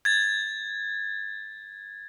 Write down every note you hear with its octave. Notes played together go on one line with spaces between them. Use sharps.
G#6 A6